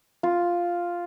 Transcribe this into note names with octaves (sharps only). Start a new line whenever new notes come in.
F4